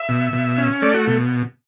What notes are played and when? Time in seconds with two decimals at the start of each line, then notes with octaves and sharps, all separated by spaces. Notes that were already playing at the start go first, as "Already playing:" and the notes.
Already playing: E5
0.09 B2
0.33 B2
0.58 C#4
0.82 A3 D5
0.94 F#4
1.07 B2